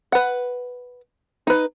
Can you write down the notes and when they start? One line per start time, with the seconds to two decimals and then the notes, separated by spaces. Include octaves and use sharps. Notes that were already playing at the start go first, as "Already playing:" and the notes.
0.12 B4 F#5
1.47 D#4 B4